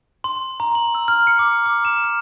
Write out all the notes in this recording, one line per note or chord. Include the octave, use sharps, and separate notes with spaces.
C6
A#5
F#7
E6
F6
C#7
D6
D6
E7
F6